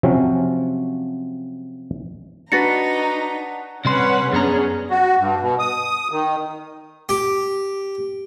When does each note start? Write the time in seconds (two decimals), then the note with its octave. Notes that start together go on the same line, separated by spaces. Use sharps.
0.03 C3 F3 F#3 C4 C#4
2.52 D4 D#4 F#4 B4 A#5 A6 A#6 C#7
3.85 C3 G3 C#4 B4 F#5 C6
4.32 F#2 B3 C#4 D4 G#4 A#5
4.90 F#4
5.19 G2
5.40 B2
5.59 D#6
6.11 D#3
7.09 G4